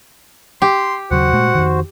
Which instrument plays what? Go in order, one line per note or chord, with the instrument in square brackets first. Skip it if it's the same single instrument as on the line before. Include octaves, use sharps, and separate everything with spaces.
[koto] G4 [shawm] C6
[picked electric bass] D#2 C#3 F#3 [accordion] F#4 C5 [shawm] F#5
[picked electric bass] A#2 G#3 A3
F2 D#3